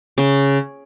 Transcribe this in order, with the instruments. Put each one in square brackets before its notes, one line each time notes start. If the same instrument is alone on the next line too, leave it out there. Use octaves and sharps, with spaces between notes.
[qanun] C#3